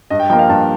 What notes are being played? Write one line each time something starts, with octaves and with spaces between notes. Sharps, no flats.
G2 D#5
G5
F3 A#3 G5
F5
G2 A5